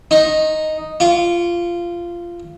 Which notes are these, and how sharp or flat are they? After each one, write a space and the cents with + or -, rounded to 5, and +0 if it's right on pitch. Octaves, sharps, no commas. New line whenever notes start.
D#4 +0 C#6 -40
F4 -15 C#6 +35